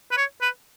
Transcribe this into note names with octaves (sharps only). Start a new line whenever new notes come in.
B4
C#5
B4